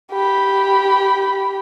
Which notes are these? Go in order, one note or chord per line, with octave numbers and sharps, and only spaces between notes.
G4 B5